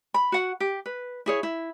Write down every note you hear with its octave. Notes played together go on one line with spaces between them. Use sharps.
B5
F#4 F#5
G4
B4
E4 G#4 C#5
E4